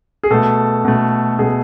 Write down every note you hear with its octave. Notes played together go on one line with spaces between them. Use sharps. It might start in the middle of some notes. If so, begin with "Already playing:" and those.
G#4
B2 A3 A4
B2 A3
B2 A3 G#4